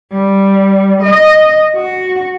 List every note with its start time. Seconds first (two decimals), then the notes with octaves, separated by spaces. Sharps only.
0.12 G3
1.02 D#5
1.76 F#4